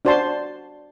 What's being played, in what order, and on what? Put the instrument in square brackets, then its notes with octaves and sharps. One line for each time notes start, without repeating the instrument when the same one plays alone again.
[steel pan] D4 F#4 C5 D5 A5 C6